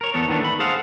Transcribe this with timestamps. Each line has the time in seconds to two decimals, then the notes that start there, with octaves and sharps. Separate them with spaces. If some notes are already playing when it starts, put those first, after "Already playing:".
0.01 A#4 C#5
0.14 E2 B3 A4 C#5
0.27 D#2 D#3 E3 B3 D4
0.40 A3 B5
0.59 G#4 A4 C5 F5 F#5